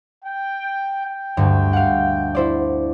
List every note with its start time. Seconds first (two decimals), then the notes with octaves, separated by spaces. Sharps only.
0.24 G5
1.05 G5
1.37 D2 G2
1.73 F5 F#5
2.35 E4 C5 D5